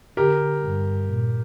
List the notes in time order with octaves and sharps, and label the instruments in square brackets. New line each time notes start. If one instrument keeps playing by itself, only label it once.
[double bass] D3 [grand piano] G4 A#4
[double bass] G2
A#2